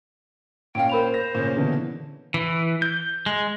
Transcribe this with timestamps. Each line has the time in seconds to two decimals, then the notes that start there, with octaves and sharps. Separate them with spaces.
0.75 A#2 C#4 F5 G5 D7
0.89 A#4 C5 B5 F7
1.14 A#6
1.35 A#2 C#3 C#4
1.56 B2 D3 E3
2.34 E3
2.82 G6
3.26 G#3